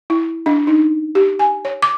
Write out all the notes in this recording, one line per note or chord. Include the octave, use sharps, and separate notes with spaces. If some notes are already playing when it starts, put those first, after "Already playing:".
E4
D4
D#4
G4
G#5
C#5
D6